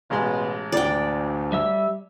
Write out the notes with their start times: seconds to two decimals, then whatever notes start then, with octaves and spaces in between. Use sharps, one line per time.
0.10 A1 B2 G#3 C6
0.72 D2 D5 G5
1.52 G3 E5 E6